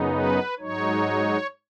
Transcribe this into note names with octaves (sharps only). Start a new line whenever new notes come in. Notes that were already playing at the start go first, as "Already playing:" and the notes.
Already playing: F#2 C#3 B3 D#4
B4
G#2 F#3 D#4 C#5